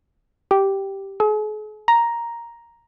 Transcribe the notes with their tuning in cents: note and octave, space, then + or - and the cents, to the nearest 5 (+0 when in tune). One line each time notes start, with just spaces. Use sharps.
G4 -5
G#4 +45
A#5 +5